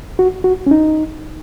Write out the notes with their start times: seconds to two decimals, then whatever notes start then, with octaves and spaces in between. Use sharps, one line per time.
0.19 F#4
0.44 F#4
0.66 C#4
0.71 D#4